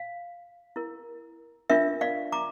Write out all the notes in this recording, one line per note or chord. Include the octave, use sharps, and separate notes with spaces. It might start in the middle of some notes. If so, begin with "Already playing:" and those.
Already playing: F5
E4 A#4
D4 F4 A#4 E5
D5 F5
A#5 D6